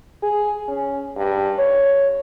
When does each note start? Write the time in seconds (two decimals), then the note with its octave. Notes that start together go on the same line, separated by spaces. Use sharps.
0.23 G#4
0.68 C#4
1.16 G2
1.58 C#5